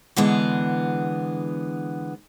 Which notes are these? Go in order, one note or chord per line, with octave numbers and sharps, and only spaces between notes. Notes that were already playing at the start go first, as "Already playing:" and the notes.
D3 E3 G#3 B3